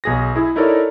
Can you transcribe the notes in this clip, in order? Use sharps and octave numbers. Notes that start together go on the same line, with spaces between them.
B1 G#4 A#6
E4 G#4
D#4 E4 A4 A#4 C#5 D5